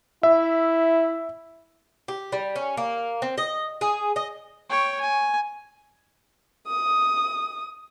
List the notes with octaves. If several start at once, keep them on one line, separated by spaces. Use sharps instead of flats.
E4 E5
G4
G3
C#4
A#3
C4
D#5
G#4
D#5
C#5 G5
G#5
D#6